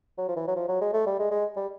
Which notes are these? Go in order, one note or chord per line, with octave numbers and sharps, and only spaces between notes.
F#3
F3
E3
F#3
F3
F#3
G#3
A3
G3
G#3
G#3
G3